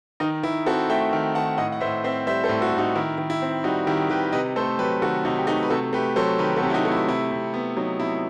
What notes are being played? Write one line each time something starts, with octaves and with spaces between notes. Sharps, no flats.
D#3 D#4
D#3 E4
C4 F#4 A4
A3 E5 G5
D#3
D#3 F#5 A5
A2 D#5 F#5
F#5
A2 C5 E5
C4 C5 E5
G3 C5 E5
A4 C5
A2
F#4 A4
A2
D#4 F#4
D#3 E4
D#3
E4
C4
G3 D#4 F#4
D#3 E4 G4
D#3 G4 B4
C3 B4 D#5
A3 A4 C5
F#3 G4 B4
D#3 F#4 A4
C3 D#4 F#4
G4
A3 D#4 F#4
B4
C3 F#4 A4
A3 G4 B4
F#3 A4 C5
D#3 G4 B4
F#4 A4
C3
E4
D#4 F#4
A3
E4
C3 E4
C3
B3
F#3 D#4
C3 E4